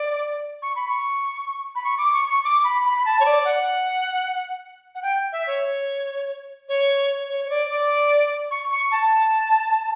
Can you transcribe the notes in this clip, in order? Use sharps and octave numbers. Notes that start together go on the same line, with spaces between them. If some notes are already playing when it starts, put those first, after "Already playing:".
Already playing: D5
C#6
B5
C#6
B5
C#6
D6
C#6
C#6
D6
B5
B5
B5
A5
C#5
D5
F#5
F#5
G5
E5
C#5
C#5
C#5
C#5
D5
D5
C#6
C#6
A5